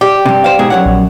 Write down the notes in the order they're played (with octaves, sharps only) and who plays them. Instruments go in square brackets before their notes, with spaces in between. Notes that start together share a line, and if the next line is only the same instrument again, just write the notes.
[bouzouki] G4 [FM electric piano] D5
[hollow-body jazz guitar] G2 C3
[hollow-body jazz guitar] C5 F5 [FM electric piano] D5
[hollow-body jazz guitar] G#2 B2 G#4
F#2 C#5 F#5
[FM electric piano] A#1